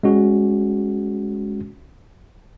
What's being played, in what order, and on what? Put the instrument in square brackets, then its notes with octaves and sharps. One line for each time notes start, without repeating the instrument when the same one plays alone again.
[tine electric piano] G#3 C#4 F#4